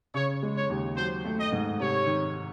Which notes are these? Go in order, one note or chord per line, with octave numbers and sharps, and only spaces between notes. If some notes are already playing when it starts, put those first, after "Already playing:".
C#3 C#5
G#3
C#5
D#2
F#3 C5
A3
D#5
G#2
C3 C#5
D#3